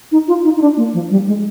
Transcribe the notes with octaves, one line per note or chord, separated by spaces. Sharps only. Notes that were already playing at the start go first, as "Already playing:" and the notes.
D#4
F4
D#4
D#4
D4
A#3
F3
G3
G#3